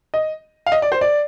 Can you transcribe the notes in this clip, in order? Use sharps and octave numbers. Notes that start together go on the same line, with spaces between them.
D#5
F5
D#5
D5
C5
D5